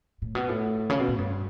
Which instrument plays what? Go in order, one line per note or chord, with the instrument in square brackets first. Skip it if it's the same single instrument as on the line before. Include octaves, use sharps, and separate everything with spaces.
[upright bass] A2
B2
A2
C#3
B2
A2
G2